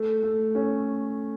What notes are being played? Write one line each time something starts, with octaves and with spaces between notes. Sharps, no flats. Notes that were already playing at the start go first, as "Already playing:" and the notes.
Already playing: A3
A3
C#4